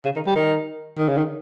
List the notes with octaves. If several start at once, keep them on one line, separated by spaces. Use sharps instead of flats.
C#3
D#3
G3
D#3
D#3
C#3
D#3